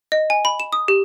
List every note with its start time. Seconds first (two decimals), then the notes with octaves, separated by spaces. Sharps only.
0.12 D#5
0.30 G#5
0.45 B5
0.60 E7
0.73 D#6
0.88 G4